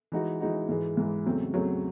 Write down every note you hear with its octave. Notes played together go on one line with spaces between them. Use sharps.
E3 G#3 D#4 F#4
E3 G#3 D#4 F#4
G#2 E3 G#3
G#2 E3 G#3
E2 C#3 F#3 A3 C4
E2 C#3 F#3 A3 C4